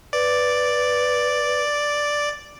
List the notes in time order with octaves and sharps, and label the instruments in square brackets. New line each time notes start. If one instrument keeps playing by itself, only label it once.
[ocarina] B4 [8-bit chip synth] D5